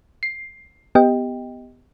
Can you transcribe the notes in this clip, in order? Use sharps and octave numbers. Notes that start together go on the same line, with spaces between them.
C7
B3 G4 D#5 G5